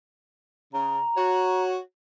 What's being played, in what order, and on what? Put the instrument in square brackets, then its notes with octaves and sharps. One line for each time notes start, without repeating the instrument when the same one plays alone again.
[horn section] C#3 [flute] A#5
[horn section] F#4 C#5